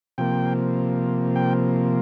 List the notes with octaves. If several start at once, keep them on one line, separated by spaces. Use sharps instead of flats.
C3 F3 A#3 G5
G5